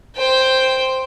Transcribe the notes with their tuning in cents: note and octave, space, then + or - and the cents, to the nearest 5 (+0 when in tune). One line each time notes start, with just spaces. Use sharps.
C5 +0 G5 +5